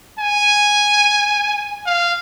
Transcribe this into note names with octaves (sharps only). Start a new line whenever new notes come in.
G#5
F5